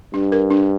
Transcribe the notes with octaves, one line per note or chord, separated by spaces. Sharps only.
G2 D4
A#4
D4